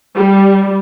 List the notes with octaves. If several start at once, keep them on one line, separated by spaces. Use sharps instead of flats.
G3